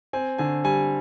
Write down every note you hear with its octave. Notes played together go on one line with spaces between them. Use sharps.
C4 G#5
D3 G#5
G3 G#5